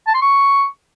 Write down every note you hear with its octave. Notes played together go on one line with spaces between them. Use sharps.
A5
C6
C#6